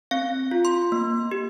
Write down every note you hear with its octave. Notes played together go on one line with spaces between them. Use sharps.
C4 F5
F4
C6
A#3
G4